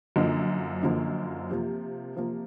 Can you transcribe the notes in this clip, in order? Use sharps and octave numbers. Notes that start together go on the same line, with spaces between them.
F#2 D3 F3 A#3 D#4
F#2 D3 F3 A#3 D#4
C3 F3 A#3
C3 F3 A#3